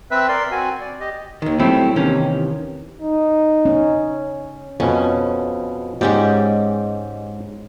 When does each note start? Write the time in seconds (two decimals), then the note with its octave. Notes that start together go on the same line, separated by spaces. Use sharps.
0.11 C4 B4 E5
0.28 A#4 D5 C6
0.51 C4 F#4 G#5
0.81 D5
1.00 G4 D#5
1.42 D#2 D#3
1.60 F#3 G3 A3 C4 E4
1.96 D#2 C3 D#3 E3 C#4
3.02 D#4
3.65 C#4
4.80 F2 B2 C#4
6.01 G#2 G#3 C#4 G4 D5 G5